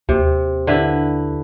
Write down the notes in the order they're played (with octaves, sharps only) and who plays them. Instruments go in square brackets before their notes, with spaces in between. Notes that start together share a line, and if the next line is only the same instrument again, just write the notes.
[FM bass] D#2 [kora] C3
[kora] D3 E4 B4